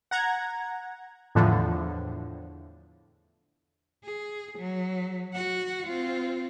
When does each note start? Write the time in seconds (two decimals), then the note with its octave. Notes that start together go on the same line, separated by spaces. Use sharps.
0.11 F#5 A#5 G#6
1.35 E2 A2 D3 F3
4.04 G#4
4.59 F#3
5.34 F#4 F#5
5.87 C4 F4